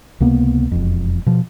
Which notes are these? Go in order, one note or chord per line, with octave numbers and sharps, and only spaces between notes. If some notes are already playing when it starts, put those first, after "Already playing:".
C#2 C3 A#3 B3
E1 F2
B2 F3